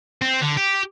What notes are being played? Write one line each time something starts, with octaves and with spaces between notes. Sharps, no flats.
C4
D3
G4